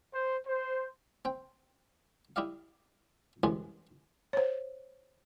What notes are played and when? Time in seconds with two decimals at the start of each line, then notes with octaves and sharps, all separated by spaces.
0.14 C5
0.47 C5
1.25 C4 G5
2.36 E4 G4 D5 D#5 F5
3.43 C2 F#2 E3 G#3 G#5
4.33 C5 C#5